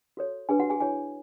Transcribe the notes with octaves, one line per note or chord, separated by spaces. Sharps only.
F#4 A4 C#5
D4 F#4 G#4 B4 G#5
F#4 F#5
G#4 G#5
E4 G#4 C#5 G#5